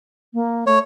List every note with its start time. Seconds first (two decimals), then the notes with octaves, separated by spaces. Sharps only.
0.34 A#3
0.67 A3 C#5